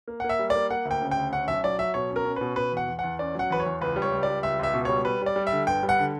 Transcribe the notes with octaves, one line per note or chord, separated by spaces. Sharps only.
A#3
F#5
A#3
E5
G3
D5
A#3
A#3 F#5
D2
G5
C#3
G5
D2
C#4 F#5
B1 E5
F#3 D5
F#3 E5
B2 C#5
C#4
A#4
C#4
B2 B4
B2 B4
E2 F#5
E2
E2 F#5
C#4 D5
F#3 F#5
E2 B4
C#5
E2
C#2 B4
G3
C#5
C#2
D5
G3
C#2 E5
C#2 E5
B2
G3 C#5
G3 B4
G3 D5
G3
E5
D3
G1 G5
G3
F#5
D3